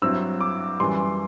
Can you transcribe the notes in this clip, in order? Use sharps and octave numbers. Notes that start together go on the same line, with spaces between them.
G2 F#3 C4 E4 E6
D6
F#2 E3 G3 C6